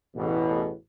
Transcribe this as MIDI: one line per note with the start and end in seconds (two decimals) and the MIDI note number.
0.15 0.71 33
0.15 0.71 40
0.15 0.71 47